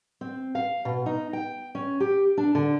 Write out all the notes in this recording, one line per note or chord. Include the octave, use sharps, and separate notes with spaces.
C4
F5
B2
D#4
G5
C#4
G4
D4
D3